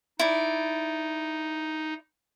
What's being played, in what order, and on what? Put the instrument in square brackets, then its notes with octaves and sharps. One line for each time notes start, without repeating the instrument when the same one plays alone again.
[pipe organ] D#4 [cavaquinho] E4 D5